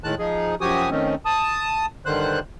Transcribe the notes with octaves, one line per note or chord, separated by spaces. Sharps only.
A2 D#3 G#3 A5 F#6
F3 D#4 G#4
F#2 F3 F#4 G4 G#5 D#6
D#3 A3 C4 C#4 D#4
A5 D#6
G2 D3 D#3 C5 F#6